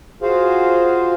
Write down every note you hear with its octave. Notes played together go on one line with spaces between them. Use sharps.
F4 F#4 G#4 C5 F5